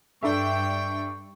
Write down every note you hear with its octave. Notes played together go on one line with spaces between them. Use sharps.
G2 D4 A4 E5 G5 C#6